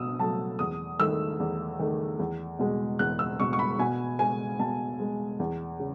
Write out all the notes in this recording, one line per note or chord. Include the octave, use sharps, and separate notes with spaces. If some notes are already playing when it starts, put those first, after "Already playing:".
Already playing: B2 D#6 E6
F#3 A3 A5
E2 D#6
D#3 A3 E6
E2
D#3 A3
E2
B2 G#3
E2 F#6
E6
B2 G#3 C#6
C#6
B5
B2 G#5
G#3 G#5
B2 A5
G#3
E2
C#3